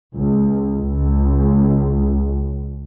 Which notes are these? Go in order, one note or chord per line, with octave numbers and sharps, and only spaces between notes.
C#2
C#2